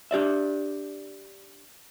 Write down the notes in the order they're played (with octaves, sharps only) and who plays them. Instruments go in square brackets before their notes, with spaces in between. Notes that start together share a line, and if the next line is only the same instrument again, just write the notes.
[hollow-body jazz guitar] D4 G4 D5 E5